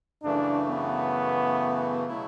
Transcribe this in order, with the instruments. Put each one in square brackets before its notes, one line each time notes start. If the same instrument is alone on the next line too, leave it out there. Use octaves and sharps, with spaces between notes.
[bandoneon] F#2 C#3 E3 A3 [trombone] D4
[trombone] B3
[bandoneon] B2 F#3 A3 E4